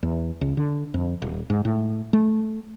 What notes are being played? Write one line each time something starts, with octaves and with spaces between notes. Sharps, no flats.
E2
C#2
D3
F2
D#1
G#2
A2
A3